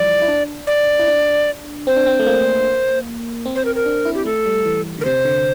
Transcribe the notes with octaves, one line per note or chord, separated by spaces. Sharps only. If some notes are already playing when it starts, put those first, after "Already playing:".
Already playing: E3 F3 G3 D5
E4
D4
D5
E4
D4
C4 C5
D4
C4
A3
A#3
C4
C5
A#4
A#4
D4
E4
G4
A3 A4
G3
E3
D3 A#4
C3 C5
D3